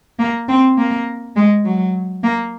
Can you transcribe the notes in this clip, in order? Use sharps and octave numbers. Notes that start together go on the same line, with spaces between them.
A#3
C4
A#3
G#3
F#3
A#3